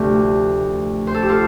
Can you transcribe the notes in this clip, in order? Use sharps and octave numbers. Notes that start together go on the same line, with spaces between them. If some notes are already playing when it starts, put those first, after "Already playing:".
Already playing: D2 C3 F3 A3 G4
C5
A4
G4
F4 A4